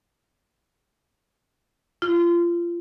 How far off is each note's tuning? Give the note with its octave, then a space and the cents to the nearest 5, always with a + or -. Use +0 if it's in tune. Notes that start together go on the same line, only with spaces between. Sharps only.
F4 -25